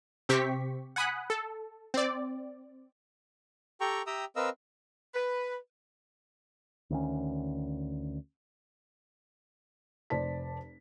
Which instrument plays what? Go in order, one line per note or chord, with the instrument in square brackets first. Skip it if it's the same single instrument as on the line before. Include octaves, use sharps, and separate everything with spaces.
[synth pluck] C3 C4 G4 C#6 B6
F#5 G#5 B5 D#6 F#6
A4
C4 D5
[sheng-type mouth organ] G4 A4 G5 A#5 C#6
G4 E5 G5 A#5 D#6 E6
C4 A#4 B4 D#5 F5 E6
[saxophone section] B4
[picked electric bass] D2 D#3 C#4
[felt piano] F1 C5 D5 A5 B6